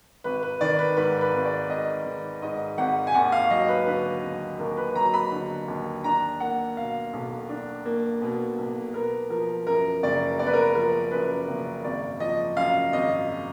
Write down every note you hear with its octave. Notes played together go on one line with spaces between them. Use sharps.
G#1 B4
B4
D#3 D5
B4
G#2 B4
B4
G#1
D5
G#1 D#5
D#3
G#2 D#5
G#1 F#5
G#5
D#2 F#5
F5
F#3 D#5
B4
D3 B4
D#2
D#2 A#4
B4
F#3 A#5
B5
D3
D#2
D4 A#5
A#3 F#5
B2 F5
B1
D4
A#3
B2
B1
B3 A#4
F3 A#4
F#2 A#4
F#1 D5
B3 D5
B4
A#4
B4
F3 A#4
F#2 B4
F#1
G#1 D5
F3 D#5
F#2 F5
G#1 D#5